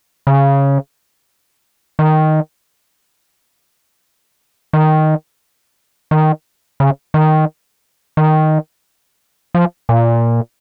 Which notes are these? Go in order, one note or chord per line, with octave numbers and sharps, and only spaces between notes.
C#3
D#3
D#3
D#3
C#3
D#3
D#3
F3
A#2